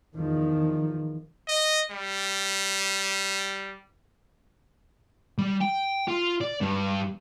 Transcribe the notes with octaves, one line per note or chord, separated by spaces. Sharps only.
E2 D#3 F3
D#5
G3
G3
G5
F4
D5
G2